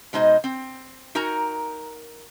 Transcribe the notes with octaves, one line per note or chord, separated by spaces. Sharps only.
B2 G#3 D#4 C5 D#5
C4
D#4 F#4 A#4 G#5 A#5